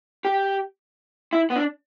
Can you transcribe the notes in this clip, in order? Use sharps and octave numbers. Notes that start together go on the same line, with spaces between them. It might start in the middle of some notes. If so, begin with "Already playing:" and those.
G4
E4
B3
D4